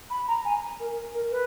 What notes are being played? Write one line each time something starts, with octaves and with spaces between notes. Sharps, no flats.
B5
A#5
G#5
A#4
A#4
B4